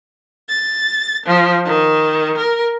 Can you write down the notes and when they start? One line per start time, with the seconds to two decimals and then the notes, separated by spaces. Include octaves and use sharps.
0.48 A6
1.26 F3
1.66 D#3
2.37 A#4